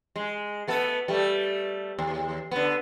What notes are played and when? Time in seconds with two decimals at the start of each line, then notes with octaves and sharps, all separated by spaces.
0.16 G#3
0.68 A3 B3 A4
1.08 G3 A3
1.99 D#2
2.51 D3 B3